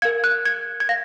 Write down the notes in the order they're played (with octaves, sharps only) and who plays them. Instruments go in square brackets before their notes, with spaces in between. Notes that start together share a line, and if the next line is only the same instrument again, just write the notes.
[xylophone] A#4 F5 G#6
F#6
G#6
G#6
F5 A#6